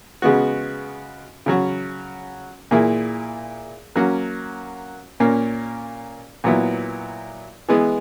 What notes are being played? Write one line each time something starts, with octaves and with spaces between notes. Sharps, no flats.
C#3 G#3 B3 F#4
C#3 F#3 C#4 F#4
A#2 A#3 E4 G#4
F#3 A#3 C#4 F#4
A#2 A#3 C#4
A#2 F#3 B3 E4
E3 G#3 B3